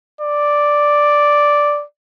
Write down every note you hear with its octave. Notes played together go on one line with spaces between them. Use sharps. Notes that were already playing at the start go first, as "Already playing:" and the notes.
D5